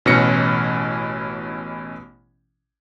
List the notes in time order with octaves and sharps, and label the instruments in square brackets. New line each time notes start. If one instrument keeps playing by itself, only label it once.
[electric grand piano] A1 B2 E3 C#4 A#6 C#7